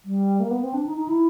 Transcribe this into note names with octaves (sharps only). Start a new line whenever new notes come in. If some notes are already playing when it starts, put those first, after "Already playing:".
G3
A#3
B3
C4
D4
D#4
D#4
E4